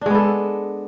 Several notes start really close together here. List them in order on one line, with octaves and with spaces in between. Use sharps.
D4 G#3 B3 A4